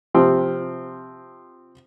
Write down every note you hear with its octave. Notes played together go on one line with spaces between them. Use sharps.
C3 F3 C4